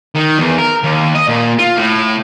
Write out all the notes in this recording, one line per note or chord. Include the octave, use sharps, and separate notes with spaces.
D#3
E2
A#4
D#2
D#5
A#2
F4
A2